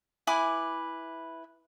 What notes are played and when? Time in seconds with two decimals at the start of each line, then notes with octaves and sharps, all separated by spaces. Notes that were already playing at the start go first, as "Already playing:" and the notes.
0.27 E4 B4 G#5 D6